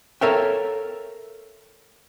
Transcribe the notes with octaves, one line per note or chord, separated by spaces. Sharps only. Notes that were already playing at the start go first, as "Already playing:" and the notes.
A4 A#4 C#5 E5 F5 G5